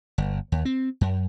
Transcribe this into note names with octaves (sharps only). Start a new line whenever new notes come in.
G1
D#2
C4
F#2